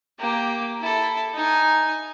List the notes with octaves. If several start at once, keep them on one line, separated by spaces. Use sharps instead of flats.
A#3 G4
E4 A4
D#4 G#5